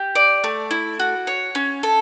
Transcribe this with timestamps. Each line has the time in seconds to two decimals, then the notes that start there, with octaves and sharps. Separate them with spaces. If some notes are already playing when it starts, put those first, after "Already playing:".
Already playing: G4
0.15 D5
0.44 A3
0.71 E4
0.99 F#4
1.27 C#5
1.55 C#4
1.83 A4